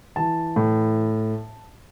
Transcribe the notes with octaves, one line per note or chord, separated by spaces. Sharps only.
E3 A5
A2